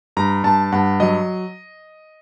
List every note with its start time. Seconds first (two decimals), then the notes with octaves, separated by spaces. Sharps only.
0.17 G2 A#5
0.44 G2 A5
0.72 G2 F#5
1.00 F#3 D#5